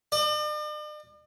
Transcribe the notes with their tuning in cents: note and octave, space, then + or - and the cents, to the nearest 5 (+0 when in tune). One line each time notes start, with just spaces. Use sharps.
D5 +45